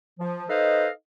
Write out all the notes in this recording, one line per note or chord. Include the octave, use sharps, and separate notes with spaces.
F3
D#4 A4 B4 C5 D#5 F5